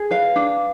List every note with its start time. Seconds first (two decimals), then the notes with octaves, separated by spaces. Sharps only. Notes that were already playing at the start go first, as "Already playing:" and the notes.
Already playing: G#4
0.11 B4 F5
0.36 D4